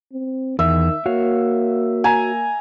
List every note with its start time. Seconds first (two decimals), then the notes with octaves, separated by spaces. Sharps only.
0.13 C4
0.59 E2 D#3 E5
1.06 A#3 F#4 C#5 F5
2.04 G#5 A#5